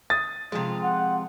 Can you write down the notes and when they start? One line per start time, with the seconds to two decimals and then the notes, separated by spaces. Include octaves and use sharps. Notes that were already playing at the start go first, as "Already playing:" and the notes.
0.10 D#6 A6
0.52 C3 F3 G#3 F4
0.83 F#5